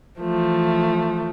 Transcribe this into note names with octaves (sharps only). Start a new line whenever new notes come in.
E3 F3 A3